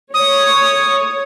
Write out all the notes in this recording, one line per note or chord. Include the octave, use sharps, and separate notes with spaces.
C#5 D#6